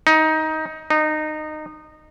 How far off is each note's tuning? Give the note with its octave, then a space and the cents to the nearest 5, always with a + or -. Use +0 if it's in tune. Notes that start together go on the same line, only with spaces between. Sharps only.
D#4 +15
D#4 -20